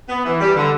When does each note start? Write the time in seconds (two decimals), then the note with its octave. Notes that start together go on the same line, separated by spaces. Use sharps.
0.09 B3
0.25 E3
0.41 G3
0.56 D3